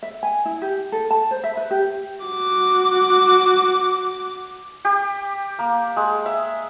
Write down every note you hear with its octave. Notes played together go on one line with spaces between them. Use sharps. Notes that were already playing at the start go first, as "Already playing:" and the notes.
E5
G#5
E4
G4
A4
A5
C5
E5
B4
G4
F#4 D6
G4
A#3
G#3
E5